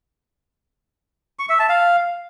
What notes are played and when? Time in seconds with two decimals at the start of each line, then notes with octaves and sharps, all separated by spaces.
1.39 C#6
1.49 E5
1.59 A5
1.69 F5